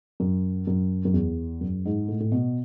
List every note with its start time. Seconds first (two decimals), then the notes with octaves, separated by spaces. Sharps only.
0.20 F#2
0.67 F#2
1.05 F#2
1.14 E2
1.61 F#2
1.85 G#2
2.08 A2
2.20 A2
2.32 B2